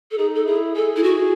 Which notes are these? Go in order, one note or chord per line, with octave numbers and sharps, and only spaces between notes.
A4
D#4 G#4
A4
E4 G#4
G#4 A4
E4
F#4